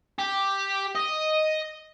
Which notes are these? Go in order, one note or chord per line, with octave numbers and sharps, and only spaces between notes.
G4
D#5